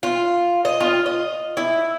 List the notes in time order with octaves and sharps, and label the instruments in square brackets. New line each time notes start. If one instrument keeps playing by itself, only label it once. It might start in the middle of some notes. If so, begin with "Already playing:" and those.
[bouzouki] F4
D#5
F4
D#5
E4